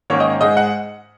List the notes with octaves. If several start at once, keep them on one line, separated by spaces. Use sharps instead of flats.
G#2 D#3 A#3 C#4 C#5
D#5
G#2 G#3 D#4 D#5
F#5